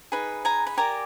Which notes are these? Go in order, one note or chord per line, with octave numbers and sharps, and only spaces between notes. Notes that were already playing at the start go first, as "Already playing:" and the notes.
D#4 G#4 B4 B5
G#5 A#5
B5
G4 A#4 D5 G#5 A#5